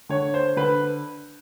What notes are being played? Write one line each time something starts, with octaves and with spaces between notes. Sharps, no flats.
D3 C#5
C5
D3 B4